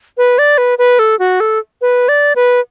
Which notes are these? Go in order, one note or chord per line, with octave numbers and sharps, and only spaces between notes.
B4
D5
B4
B4
A4
F#4
A4
B4
D5
B4